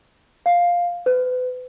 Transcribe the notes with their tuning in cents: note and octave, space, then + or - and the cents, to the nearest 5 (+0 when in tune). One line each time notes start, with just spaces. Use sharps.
F5 +5
B4 +35